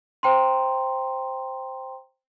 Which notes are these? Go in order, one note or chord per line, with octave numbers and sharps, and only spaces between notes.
C5 G5 A#5 C6